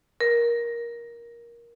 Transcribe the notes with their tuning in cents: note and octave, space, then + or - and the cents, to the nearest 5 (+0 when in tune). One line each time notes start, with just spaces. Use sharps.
A#4 +15